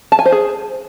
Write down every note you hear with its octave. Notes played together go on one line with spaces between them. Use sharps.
A5
G#5
C5
G#4